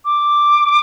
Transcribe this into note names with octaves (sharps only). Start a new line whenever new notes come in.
D6